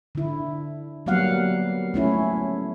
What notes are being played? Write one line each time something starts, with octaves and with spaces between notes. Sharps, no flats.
D3 E4
F#3 G3 A#3 B3 F5 F#5
A3 C#4 E4